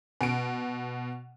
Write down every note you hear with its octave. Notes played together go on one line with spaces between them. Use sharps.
B2 D7